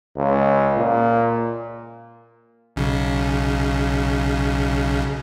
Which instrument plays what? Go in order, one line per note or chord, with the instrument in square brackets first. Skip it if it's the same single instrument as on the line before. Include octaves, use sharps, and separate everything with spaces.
[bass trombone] C#2
A#2
[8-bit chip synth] B1 C#3